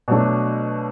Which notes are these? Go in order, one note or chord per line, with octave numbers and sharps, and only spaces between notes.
B2 F#3 A3 D4